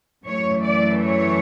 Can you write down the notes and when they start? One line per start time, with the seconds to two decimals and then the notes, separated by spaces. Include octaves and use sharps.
0.24 F#2 E3 A3 C#5
0.63 D5
1.02 C#5